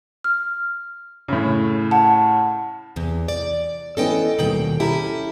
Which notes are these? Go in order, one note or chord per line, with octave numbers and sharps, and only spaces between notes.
F6
A2 C#3
F#5 A5
E2 C3
D5
E3 B3 C#4 A4 D#5 G5
D#1 B2 D#3 G5 F#7
C#4 E4 G4 A4 A#5